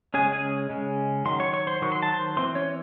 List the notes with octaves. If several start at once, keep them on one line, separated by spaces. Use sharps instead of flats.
C#3 G#3 C#4 G#4 G#5
G#4 G#5
C#3 G#3 C#4
D#3 F#3 C6
C#5 C#6
C#5 C#6
C5 C6
D#3 F#3 C#6
C6
A5
C5 C6
E3 C4 C5 C6
C#4 C#5